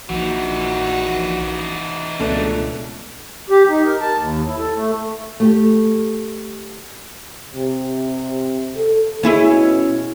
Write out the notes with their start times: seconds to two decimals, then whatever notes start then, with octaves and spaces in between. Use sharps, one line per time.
0.09 A#1 E3 D#4 F#4
2.20 C#2 B2 A3 D4
3.50 G4
3.69 D#4
3.86 A#4
4.01 A5
4.17 D#2
4.46 E4
4.58 A4
4.75 A3
5.40 A3 G4
7.54 C3
8.75 A4
9.23 B2 C#4 E4 G#4